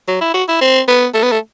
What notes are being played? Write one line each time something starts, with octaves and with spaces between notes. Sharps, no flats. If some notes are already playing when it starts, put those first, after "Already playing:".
F#3
E4
F#4
E4
C4
B3
A3
B3
A3